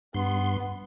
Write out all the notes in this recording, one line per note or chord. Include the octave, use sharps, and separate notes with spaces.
G2 B3 C6